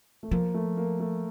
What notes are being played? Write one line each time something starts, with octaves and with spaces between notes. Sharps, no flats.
A3
F3 A#3
A3
A#3
A3